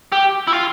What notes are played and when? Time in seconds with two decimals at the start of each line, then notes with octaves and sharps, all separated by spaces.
0.12 G4
0.47 E4
0.53 F4